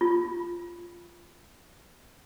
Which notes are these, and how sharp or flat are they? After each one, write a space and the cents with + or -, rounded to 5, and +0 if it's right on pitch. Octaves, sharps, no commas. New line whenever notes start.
F4 -10